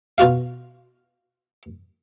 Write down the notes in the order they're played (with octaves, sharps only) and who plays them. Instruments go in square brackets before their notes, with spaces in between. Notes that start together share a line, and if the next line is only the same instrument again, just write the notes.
[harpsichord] B2 F4 F#4 F5